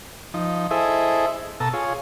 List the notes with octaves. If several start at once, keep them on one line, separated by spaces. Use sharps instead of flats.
F3 D#4
E4 G#4 A4 C5 D#5 E5
B2 A4 A5 A#5 E6
F4 G#4 C#5